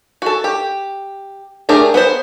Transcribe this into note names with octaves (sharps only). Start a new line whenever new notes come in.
F#4 A4
G4
A3 D4 G4 G#4 A#4
B3 A#4 C5